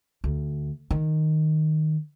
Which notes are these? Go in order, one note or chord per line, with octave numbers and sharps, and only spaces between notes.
D2
D#3